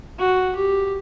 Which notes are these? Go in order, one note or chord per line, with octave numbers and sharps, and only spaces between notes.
F#4
G4